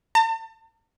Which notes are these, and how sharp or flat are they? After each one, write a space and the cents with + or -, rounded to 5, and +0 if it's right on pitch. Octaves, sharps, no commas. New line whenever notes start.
A5 +40